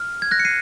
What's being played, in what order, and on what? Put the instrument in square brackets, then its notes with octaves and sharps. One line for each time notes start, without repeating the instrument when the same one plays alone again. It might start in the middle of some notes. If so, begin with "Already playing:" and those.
Already playing: [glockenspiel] F6
G#6
F#6 A#6
C#7
C7 D#7